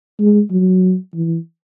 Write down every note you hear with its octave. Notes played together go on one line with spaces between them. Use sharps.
G#3
F#3
E3